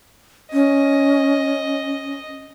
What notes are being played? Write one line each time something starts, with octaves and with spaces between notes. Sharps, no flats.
C#4 D#5